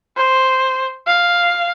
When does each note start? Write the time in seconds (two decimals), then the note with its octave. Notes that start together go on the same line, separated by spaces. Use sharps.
0.17 C5
1.07 F5